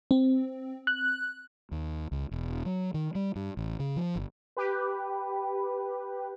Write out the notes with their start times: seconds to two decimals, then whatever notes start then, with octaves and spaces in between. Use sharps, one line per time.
0.11 C4
0.87 F#6
1.71 D#2
2.12 C#2
2.31 E1
2.66 F#3
2.94 D#3
3.15 G3
3.36 G2
3.57 A1
3.80 C#3
3.96 F3
4.16 G1
4.57 G4 B4